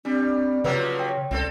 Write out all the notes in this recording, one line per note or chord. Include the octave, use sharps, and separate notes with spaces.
G3 C4 D4
C#3 F3 F#3 A#3 B4 C#5 E6
G5
C#2 C4 D4 A4